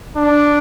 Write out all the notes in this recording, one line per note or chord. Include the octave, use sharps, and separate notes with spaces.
D4